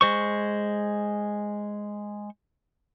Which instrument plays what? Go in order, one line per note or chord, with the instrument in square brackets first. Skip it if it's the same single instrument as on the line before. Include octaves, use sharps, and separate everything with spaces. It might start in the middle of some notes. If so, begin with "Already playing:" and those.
[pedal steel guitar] G#3 C5 C#6